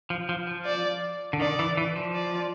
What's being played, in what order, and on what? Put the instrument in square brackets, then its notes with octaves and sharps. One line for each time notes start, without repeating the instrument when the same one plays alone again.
[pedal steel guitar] F3
F3
F3
[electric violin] D5
[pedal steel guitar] D3
[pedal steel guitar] D#3 [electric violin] D5
[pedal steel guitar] E3
E3
F3
[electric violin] D5